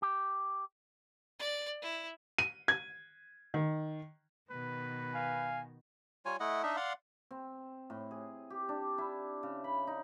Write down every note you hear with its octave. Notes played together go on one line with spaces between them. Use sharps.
G4
D5
E4
D#7
G#6
D#3
B2 D#3 B4
F5 G#5
G3 F4 C#5 G#5
A3 E4 D#5 F#5
D4 D#4 D#5 E5
D5 F5 F#5 C6
C4
A2
G#4
G4
D4
E4
C#3
B5
D#4